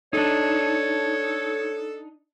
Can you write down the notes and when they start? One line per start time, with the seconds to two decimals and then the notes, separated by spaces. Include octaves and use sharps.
0.13 D4 D#4 A4 C#5